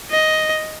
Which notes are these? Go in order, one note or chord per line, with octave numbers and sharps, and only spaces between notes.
D#5